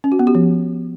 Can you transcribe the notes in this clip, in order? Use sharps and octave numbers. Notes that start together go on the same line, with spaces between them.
C#4
F#4
B3
G4
F3